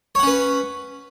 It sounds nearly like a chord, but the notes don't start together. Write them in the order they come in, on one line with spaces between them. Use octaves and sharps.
C#5 F#5 C#4 B4